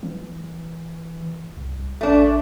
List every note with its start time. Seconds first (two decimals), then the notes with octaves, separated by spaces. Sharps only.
0.03 E3
1.57 C2
2.01 A1 A3 D4